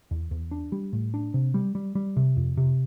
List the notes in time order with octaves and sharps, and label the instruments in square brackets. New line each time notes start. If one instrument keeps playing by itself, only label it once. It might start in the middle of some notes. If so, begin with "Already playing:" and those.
[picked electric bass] E2
E2
D4
G3
A2
D4
C3
G3
G3
G3
C3
F2
C3